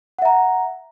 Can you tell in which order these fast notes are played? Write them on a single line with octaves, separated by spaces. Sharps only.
F#5 E5 A#5